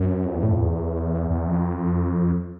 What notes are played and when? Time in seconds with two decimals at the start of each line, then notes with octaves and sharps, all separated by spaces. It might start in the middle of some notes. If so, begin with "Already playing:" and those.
Already playing: F#2
0.25 F2
0.34 E2
0.43 A2
0.52 F2
0.60 E2
1.30 E2
1.48 F2